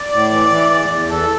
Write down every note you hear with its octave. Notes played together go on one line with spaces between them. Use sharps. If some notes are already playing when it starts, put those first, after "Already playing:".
Already playing: D5
A2
E3
E3
E2
E2
E3 A4